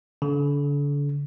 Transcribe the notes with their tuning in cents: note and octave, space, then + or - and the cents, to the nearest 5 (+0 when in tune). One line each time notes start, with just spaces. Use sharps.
D3 -35